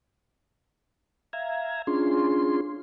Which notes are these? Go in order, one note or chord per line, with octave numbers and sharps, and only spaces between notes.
E5 F5 A#5 G#6
C#4 D4 F4 G#4 C6